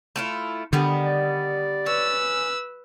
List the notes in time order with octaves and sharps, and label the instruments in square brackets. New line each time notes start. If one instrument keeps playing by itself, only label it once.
[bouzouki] A3 E4 F4
[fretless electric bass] D3 [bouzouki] D#3 G3 B3
[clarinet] D5
[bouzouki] C#4 [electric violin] B4 E6